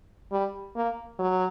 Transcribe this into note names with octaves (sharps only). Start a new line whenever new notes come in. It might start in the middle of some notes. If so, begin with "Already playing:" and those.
G3
A#3
F#3